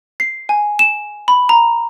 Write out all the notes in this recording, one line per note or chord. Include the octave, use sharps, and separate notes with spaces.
C7
G#5
E7
B5
A#5